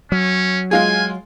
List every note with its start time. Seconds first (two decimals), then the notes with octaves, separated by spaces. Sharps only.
0.12 F#3 C#4
0.71 G#3 F4 G#4 G#5